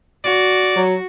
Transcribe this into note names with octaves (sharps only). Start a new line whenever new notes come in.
F#4 D5
F#3